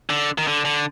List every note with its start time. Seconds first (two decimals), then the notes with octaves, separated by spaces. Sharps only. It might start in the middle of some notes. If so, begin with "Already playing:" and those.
0.10 D3
0.38 D#3
0.47 D3
0.65 D3